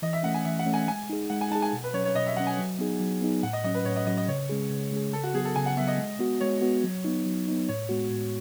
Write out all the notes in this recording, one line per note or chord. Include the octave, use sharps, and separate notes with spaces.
E3 D#5
E5
A3 C#4 F#5
G#5
E3 E5
F#5
A3 C#4
G#5
G#3 G#5
D#4 G#4
G#3 F#5
G#5
D#4 G#4 A5
G#5
B2
B4
F#3 C#4 C#5
C#5
B2 D#5
E5
F#3 C#4 F#5
G#5
F#3
B3 D#4 G#4
F#3
B3 D#4 G#4
A2 F#5
D#5
F#3 C#4 D#5
B4
A2 C#5
D#5
F#3 C#4 D#5
D#5
C#3 C#5
G#3 C#4 G#4
C#3
G#3 C#4 G#4
C#3 A4
F#4
F#3 B3 G#4
A4
C#3 G#5
F#5
F#3 B3 E5
D#5
G#3
B3 F#4
G#3 C#5
B3 F#4
F#3
B3 D#4
F#3
B3 D#4
A2 C#5
G#3 B3 F#4
A2